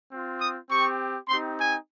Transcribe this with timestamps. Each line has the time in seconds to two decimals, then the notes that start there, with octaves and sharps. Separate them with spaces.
0.10 C4 F4
0.40 D#6
0.69 C4 G4 C#6
1.28 C4 D#4 G4 C6
1.59 G#5